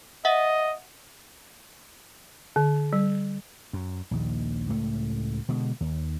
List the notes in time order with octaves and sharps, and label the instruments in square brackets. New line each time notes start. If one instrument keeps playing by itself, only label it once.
[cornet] D#5 [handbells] E5 F#5
[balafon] D3
G3
[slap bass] F#2
A#1 D#2
C#2 A2 A3
B2 D3 G#3
D#2